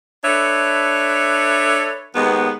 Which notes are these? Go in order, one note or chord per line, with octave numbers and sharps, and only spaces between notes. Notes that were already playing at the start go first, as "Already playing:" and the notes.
D4 A4 B4 C#5 E5
D#2 G#3 B3